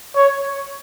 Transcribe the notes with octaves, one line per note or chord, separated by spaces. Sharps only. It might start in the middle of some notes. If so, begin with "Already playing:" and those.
C#5